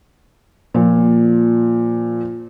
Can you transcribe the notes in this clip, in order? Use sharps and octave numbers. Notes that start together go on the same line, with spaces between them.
A#2 F3